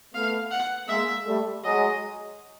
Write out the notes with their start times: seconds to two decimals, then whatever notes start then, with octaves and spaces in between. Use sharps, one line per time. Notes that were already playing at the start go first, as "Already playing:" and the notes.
0.14 A3 B3 F5
0.51 F#5
0.88 G#3 A#3 E5
1.26 G3 A3
1.64 F#3 G#3 D#5